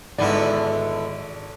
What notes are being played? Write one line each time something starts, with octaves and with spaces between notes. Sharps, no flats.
G#1 G#2 D3 D#3 B3 E4 D5 D#5